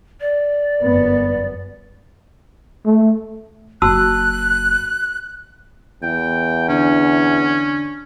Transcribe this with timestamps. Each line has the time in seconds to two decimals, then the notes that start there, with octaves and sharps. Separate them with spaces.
0.21 D5
0.81 G1 F#2 B3
2.86 A3
3.82 F#1 F#4 A5 E6 F#6
6.03 E2 G5
6.69 D3 C#4